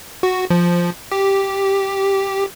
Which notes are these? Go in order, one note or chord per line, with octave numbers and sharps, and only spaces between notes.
F#4
F3
G4